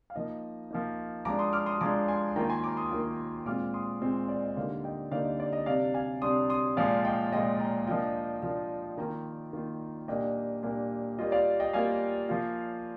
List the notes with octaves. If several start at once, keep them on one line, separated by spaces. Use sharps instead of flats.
F5
F3 A#3 D#4 D#5
F3 A#3 D#4
F3 G#3 D4 A#5 D6
C6 D#6
D6 F6
C6 D#6
F3 G#3 D4 A#5 D6
G#5 C6
D#3 A#3 F4 G5 A#5
G#5 C6
A#5 D6
C6 D#6
D#3 A#3 F4
A#2 G#3 C4 F4 D6 F6
C6 D#6
A#2 G#3 C4 F4
D5
D#5
D3 G3 A#3 D#4 D5 F5
D#5 G5
D3 G3 A#3 D#4 D5 F5
D#5
D5
D#5
C3 G3 D4 D5 F5
F5 G#5
C3 G3 D4 C6 D#6
C6 D#6
A#2 F3 G#3 D5 F5
D#5 G5
A#2 F3 G#3 D#5 G5
G5 A#5
F3 A#3 D4 F4 D#5 G5
F3 A#3 D4 F4
D#3 A#3 F4 G5 A#5
D#3 A#3 F4
A#2 G3 A#3 D4 D#5 G5
A#2 G3 A#3 D4
G3 A#3 F4 D#5
D5 F5
D#5 G5
G3 A#3 F4 F5 G#5
F3 A#3 F4